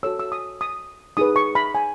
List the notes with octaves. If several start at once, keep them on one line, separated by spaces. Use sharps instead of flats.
F#4 A4 C#5 E6
E6
D#6
D#6
D#4 G#4 B4 D#6
C#6
B5
G#5